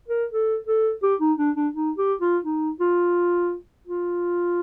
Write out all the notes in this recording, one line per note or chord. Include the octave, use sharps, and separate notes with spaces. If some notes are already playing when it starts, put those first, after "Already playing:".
A#4
A4
A4
G4
D#4
D4
D4
D#4
G4
F4
D#4
F4
F4